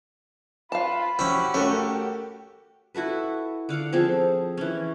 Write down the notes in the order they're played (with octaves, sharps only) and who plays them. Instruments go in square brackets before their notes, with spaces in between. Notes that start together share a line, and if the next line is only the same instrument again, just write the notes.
[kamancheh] F4 B4 [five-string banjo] F5 A5 [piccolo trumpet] B5
[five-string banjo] F3 [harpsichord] C#4 E4 [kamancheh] F#4 G4
[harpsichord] A3 [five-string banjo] C#4 A#4
[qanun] E4 F#4 A4 B4
D3 F5 F#5 D6
F3 C4 G#4 A4
E3 C#4